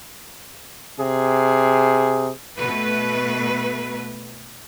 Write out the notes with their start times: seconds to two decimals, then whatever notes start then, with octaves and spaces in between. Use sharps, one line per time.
0.99 C3 G#4
2.58 B2 A3 B4